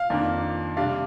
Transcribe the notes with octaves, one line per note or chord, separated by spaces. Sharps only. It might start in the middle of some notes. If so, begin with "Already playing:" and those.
Already playing: F5
F2 D#3 A#3 D4
C3 G3 D4 F5